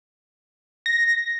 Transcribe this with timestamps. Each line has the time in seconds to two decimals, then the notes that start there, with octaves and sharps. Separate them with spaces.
0.86 A#6